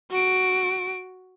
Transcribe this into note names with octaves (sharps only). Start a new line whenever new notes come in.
F#4 D7